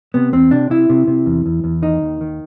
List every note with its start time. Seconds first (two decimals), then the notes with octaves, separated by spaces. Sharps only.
0.14 C3 B3
0.33 E2 C4
0.51 C3 D4
0.70 C3 E4
0.90 C3
1.07 C3
1.26 E2
1.46 E2
1.64 E2
1.82 D#3 D#4
2.02 D#2
2.21 D#3